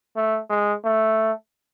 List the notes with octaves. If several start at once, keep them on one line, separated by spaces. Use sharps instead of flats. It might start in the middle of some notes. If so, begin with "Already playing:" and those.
A3
G#3
A3